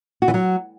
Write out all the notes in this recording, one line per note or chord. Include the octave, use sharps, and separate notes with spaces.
F#4
E3
F#3